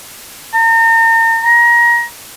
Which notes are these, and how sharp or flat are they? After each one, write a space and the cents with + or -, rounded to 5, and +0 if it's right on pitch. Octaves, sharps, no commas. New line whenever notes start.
A#5 -40
A#5 +25